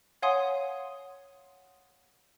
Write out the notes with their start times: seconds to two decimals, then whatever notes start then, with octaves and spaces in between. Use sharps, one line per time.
0.22 C#5 F5 F#5 G#5 C6 D#6